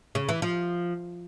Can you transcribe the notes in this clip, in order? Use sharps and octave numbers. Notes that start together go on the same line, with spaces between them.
C#3
E3
F3